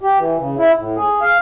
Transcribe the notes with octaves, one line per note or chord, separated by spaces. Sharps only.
G4
E3
C#3
E4
A2
G#4
F5